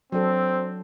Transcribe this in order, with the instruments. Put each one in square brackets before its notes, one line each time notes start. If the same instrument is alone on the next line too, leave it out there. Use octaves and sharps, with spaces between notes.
[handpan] F#3 D4 A4 [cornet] C4